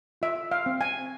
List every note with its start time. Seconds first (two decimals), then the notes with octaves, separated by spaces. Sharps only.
0.22 F4 E5
0.51 F5
0.66 C4
0.81 G#5